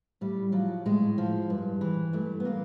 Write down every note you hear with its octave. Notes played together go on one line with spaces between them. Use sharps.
A2 G3
F3 F#3
A2 G#3
F3
G2
E3
G2 A3
B3
E3 A#3